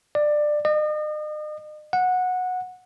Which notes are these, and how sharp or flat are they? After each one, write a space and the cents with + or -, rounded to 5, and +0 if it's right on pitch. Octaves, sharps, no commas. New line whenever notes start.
D5 +20
D#5 -40
F#5 -15